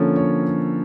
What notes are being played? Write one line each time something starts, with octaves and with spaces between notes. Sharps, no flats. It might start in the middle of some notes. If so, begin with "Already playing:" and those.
Already playing: D3 F3 A#3 C#4 A4
C#5